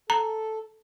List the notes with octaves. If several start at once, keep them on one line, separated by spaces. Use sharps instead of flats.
A4 A#5